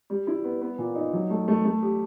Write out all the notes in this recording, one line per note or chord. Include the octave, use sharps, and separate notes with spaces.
G3
E4
B3
B3
A#2
D#4
F#3
A3
A3
A3
G4